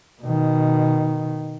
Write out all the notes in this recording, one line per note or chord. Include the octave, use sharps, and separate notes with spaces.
B2 D#3